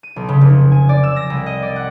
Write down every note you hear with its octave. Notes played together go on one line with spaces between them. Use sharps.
D#7
B1
C#3
F1
G#5
D5
E6
A#6
C2
D#5
D5
F#5